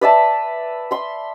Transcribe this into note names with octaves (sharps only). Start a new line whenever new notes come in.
B4 D5 E5 A5
B5 C6